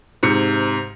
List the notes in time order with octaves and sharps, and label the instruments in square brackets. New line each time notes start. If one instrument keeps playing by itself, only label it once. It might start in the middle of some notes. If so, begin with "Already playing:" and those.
[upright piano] G#2 C3 C#7